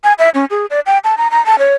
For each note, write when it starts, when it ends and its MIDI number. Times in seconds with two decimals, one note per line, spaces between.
0.04 0.13 80
0.19 0.29 76
0.34 0.45 61
0.50 0.66 68
0.70 0.80 74
0.86 0.98 79
1.04 1.15 81
1.18 1.28 82
1.31 1.44 82
1.46 1.59 81
1.59 1.75 73